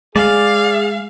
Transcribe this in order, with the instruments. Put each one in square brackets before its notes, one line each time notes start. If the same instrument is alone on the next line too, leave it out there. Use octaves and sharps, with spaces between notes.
[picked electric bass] G#3 [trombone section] G#4 [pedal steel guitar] D5 [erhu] F5